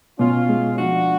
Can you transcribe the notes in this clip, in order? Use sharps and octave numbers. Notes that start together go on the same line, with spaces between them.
B2 C#4 F4
G#3
F3 D4 F#4